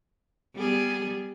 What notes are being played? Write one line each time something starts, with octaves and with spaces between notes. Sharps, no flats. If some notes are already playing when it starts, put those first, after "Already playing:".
G3 B3 G#4